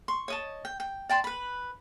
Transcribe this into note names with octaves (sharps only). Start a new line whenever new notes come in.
C6 C#6
C#5 D#5 A5
G5
G5
D5 G5 A5 C6
B4 B5